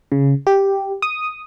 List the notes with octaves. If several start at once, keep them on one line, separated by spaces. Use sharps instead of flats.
C#3
G4
D#6